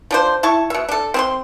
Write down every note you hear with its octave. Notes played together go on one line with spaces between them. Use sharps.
F3 D4 C5
E4 A5 C#6
B2 E5
D4 A4
C4 G#4 C6